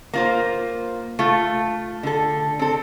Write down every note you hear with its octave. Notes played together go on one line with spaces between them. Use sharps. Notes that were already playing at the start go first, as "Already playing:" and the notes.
A#3 F4 C5
A3 F4
D3 A4
C4 A4